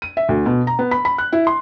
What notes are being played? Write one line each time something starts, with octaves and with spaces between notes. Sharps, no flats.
D#7
E5
D2
B2
A#5
B3
B5
B5
F#6
E4
C6